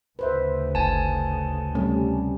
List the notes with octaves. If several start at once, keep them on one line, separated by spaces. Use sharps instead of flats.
D2 C#3 B4 C5 E5
G1 G#5 A5
C3 G3 A3 C#4